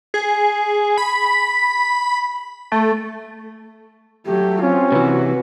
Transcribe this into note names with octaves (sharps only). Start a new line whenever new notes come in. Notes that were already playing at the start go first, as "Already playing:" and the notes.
G#4
B5
A3
F#3 A3 G4
C4 C#4 F4
C3 E3 F#4 B4